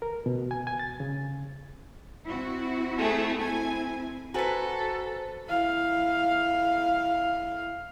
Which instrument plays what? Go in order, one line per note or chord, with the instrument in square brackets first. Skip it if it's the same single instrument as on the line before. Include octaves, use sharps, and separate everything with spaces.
[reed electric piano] A#4
B2
G#5
G#5
A6
C#3
[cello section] C4 E4 F#4
[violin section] A3 G#4
[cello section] C4 E4 [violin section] G#5
[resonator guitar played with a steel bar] F#4 B4 [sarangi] A4 [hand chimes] C5 G#5 A#5
[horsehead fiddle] E4 F5